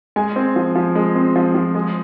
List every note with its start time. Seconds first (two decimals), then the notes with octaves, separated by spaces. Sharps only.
0.16 G#3 G#5
0.36 C4
0.56 F3
0.75 F3
0.95 G#3
1.15 C4
1.36 F3
1.55 F3
1.75 G#3